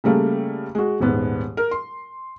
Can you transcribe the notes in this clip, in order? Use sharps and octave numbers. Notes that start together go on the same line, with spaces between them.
C#3 G3 A3 A#3
G#3 F#4
D#1 G#2 B3
A#4
C6